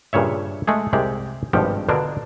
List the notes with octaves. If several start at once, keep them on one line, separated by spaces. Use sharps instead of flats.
G2 A#2 C#3 C#5 E5
G#3 A3 G#4
C2 C3 G#3 G4 D5
G#1 G2 B2 F3 G4
B2 D3 D4 F4 A#4